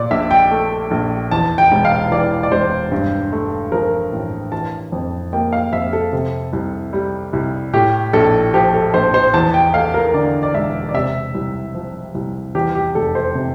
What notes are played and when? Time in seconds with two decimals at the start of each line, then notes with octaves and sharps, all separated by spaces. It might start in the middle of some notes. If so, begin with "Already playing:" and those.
Already playing: A#2 D5
0.11 A#1 E5
0.31 G5
0.51 A3
0.91 A#1
1.31 E2 A5
1.58 G5
1.72 E1
1.85 F5
2.12 E3 D5
2.43 D5
2.52 E1 C5
2.92 G2
3.32 A3
3.72 F3 A#4
4.12 A1
4.52 E3 A5
4.92 F2
5.33 A#3 G5
5.53 F5
5.73 F2 E5
5.93 A4
6.13 C3
6.53 C2
6.93 G3
7.33 C2
7.73 A2 G4
8.13 A#1 A4
8.54 F3 G4
8.74 A4
8.94 A#1 C5
9.14 C5
9.34 E2 A5
9.54 G5
9.74 A3 F5
9.94 A#4
10.14 D3 D5
10.43 D5
10.54 E1 E5
10.89 D5
10.94 C3 E5
11.34 C2
11.75 F3
12.15 C2
12.55 E2 G4
12.75 G4
12.95 F1 A4
13.15 C5
13.35 C3